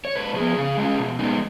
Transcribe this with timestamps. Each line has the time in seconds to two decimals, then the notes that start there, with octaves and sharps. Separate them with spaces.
0.05 C#5
0.16 G#2 B4
0.36 F3 B3 G#4
0.57 C#3
0.77 G#3 C#4 F4
0.98 B2
1.19 G#3 B3 D#4